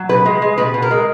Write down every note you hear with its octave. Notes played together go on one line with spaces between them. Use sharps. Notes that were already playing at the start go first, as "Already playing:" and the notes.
Already playing: F#3
B2 B4
G#3
G#3
B2 B4
B2
A#4
G#3